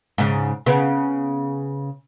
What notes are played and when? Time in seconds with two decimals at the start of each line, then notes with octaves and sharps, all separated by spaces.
0.18 G#2 C#3
0.66 C#3 B3